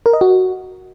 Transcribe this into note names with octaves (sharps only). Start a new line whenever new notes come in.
A#4
D#5
F#4